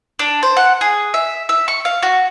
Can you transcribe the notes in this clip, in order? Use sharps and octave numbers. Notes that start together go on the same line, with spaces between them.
D4
C5
F#5
G#4
E5
E5
C#6
F5
F#4